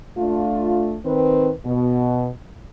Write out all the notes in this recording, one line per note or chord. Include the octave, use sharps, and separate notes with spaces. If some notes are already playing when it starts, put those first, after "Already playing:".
A3 D4 F4
D#3 C4 B4
B2